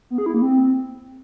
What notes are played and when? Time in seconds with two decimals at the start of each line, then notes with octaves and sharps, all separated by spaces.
0.10 B3
0.18 G#4
0.26 E4
0.34 A#3
0.42 C4